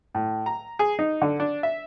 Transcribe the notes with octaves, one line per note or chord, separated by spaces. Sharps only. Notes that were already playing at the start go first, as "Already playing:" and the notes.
A2
A#5
G#4
D#4
D3
D4
E5